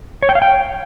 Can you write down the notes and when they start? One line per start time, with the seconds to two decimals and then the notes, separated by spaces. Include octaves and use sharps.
0.22 C#5
0.29 G5
0.35 F5
0.42 G5